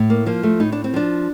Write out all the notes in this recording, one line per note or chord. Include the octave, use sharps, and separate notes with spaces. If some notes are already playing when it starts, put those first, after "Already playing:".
Already playing: A2
A#3
F3 A#3
A3
A2 D#4
D4
C4
F3 D4